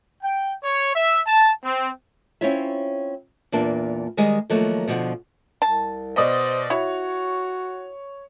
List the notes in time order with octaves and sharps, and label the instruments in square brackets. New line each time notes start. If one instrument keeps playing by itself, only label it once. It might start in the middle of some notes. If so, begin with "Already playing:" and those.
[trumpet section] G5
C#5
E5
A5
C4
[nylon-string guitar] C4 C#4 E4 F4 C#5 E5
E2 A#2 A#3 D4 A5
D#3 G3 G#3 G#4 D#5
D#3 F3 F#3 A3 A#3 F#4
B2 D3 F3 D#5 F#5
[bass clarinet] C2 [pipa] A5
[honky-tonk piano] B2 D5 D#5 [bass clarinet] C5
[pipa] E4 [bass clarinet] F#4 [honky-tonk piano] C#5